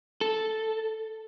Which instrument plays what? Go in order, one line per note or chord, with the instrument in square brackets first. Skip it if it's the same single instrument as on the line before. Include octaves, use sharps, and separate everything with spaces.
[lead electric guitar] A4